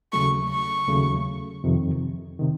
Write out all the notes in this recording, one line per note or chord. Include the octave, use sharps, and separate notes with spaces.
D#2 C#3 F#3 A3 C#6
C#6
D#2 C#3 F#3 A3
F2 C3 D#3
C3 D#3